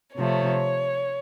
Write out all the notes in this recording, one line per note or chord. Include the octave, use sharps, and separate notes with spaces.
C3 F3 A3 C#5